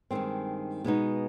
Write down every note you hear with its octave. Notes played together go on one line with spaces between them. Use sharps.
G2 D#3 G#3 C4
B2 G#3 B3 D#4